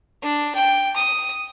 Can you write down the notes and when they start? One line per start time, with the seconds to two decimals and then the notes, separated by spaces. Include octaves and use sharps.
0.22 D4
0.55 G5
0.96 D#6